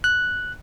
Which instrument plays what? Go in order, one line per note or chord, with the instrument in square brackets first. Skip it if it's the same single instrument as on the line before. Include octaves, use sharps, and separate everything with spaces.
[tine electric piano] F#6